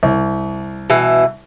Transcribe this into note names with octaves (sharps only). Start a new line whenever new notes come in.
C2
B2 E3